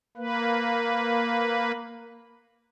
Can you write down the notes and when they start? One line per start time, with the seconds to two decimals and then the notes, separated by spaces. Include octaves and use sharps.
0.17 A#3 B4